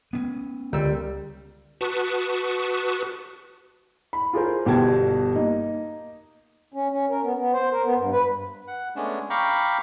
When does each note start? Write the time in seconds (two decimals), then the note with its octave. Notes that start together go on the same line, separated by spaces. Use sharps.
0.13 B3 C#4
0.73 C#2 D3 G3 E6
1.81 F#4 B4 A5 C#6 D#6
4.13 B5
4.33 F4 G#4 A#4 C5
4.66 G1 B2 G4 G5 A5 G#6
5.35 A#3 D#4
6.73 C#4
6.90 C#4
7.10 A#4
7.23 B3
7.38 B3
7.53 C5
7.72 A#4
7.84 B3
7.98 G2
8.12 B4
8.68 F#5
8.96 G#3 A3 B3 C#4 D4
9.30 F5 G5 A#5 B5 C#6 D6